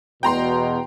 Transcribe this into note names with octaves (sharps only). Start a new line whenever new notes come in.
E2 B2 G5 A#5 C6